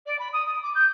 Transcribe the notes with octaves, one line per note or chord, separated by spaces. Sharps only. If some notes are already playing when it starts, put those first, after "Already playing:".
D5
B5
D#6
D#6
D6
G6